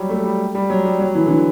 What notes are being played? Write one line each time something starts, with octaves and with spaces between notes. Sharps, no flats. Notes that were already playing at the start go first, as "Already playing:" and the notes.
Already playing: F#3 G3
A3
G3
G3
F#3
G3
F#3
E3
D3
E3